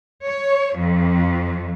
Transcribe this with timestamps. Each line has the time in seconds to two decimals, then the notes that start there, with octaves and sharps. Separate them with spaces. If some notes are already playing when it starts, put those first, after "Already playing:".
0.24 C#5
0.74 F2